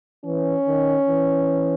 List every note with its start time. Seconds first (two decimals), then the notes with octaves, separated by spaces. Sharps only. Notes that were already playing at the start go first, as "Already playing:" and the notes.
0.25 E3 C#4
0.67 D#3
1.09 E3